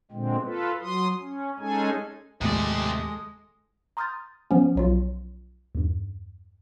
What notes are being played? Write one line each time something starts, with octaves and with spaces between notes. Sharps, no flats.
A#2 D3 G#3 C4
F4 A4 B4
F#3 C6 D#6
C#4
G#3 C#4 D#4 G#4 A4 G#5
D#2 A2 C3 F3 G#3 A4 D5 D#6
A#5 C6 D#6 F6 G6 A6
F3 B3 C#4
B1 F#3 F4
E2 G2